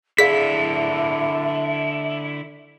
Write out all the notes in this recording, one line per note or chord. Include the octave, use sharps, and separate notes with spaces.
D3 E4 G#4 D5 E5 F5 B6